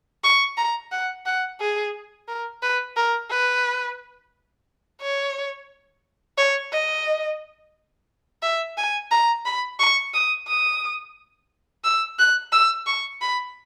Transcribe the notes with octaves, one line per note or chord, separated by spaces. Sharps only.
C#6
A#5
F#5
F#5
G#4
A#4
B4
A#4
B4
C#5
C#5
D#5
E5
G#5
A#5
B5
C#6
D#6
D#6
E6
F#6
E6
C#6
B5